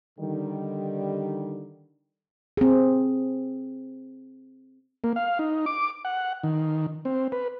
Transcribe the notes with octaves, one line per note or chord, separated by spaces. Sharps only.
D3 D#3 G3
C4 G#4
A#3
F5
D#4
D6
F#5
D#3
C4
B4